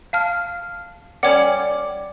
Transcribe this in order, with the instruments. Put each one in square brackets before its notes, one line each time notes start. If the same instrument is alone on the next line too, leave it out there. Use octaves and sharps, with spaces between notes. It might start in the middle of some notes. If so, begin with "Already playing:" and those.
[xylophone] F5 A5 F6
[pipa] G3 C#4 D5 [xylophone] C#5 F#5